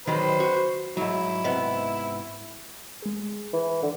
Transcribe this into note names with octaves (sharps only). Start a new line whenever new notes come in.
D#3 F#3 B4 C5 B5
F#4
G#2 F#3 E4
G#2 C3 B3
G#3 G#4
E3
D3